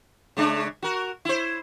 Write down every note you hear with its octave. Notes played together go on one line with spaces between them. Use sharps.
C#3 G#3 D4
F#4 A#4
E4 C5